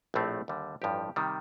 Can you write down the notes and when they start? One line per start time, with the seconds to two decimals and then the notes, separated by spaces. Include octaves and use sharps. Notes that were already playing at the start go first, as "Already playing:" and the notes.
0.14 A#1 A2 A3 C4
0.48 D#2 D3 G3
0.82 A1 G2 F3 G4
1.16 C3 D#3 G3